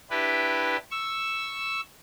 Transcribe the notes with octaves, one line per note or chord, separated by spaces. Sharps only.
D4 E4 G4 B4
C#6 E6